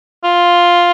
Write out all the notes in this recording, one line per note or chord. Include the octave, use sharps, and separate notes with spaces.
F4